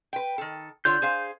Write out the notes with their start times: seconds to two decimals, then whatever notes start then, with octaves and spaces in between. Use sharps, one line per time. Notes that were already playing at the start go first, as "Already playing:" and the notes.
0.13 B4 G5
0.38 D#3 A4
0.85 D3 F4 C#5 G6
1.02 G#4 C5 F5